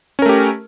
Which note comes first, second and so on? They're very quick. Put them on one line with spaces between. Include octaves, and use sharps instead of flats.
C#4 A#4 A3 G4